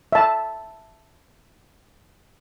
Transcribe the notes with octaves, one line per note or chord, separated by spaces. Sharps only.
E5 A5